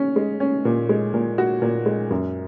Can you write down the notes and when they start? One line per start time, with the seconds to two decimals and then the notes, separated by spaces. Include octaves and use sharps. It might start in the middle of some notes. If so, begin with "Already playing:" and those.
Already playing: C#4
0.16 G#3
0.40 C#4
0.65 A#2
0.89 G#3
1.14 A#2
1.38 F#4
1.62 A#2
1.86 G#3
2.11 F#2